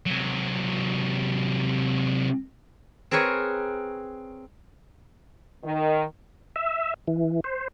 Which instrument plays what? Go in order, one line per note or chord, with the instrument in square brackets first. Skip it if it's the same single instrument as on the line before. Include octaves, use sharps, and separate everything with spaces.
[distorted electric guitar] C3 F#3
[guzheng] C4 G#4 A#4 B4 C#5 G#5
[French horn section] D#3
[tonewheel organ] E5
E3
C5